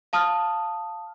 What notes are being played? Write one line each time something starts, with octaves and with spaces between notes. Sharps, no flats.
F5 A5 D#6 F6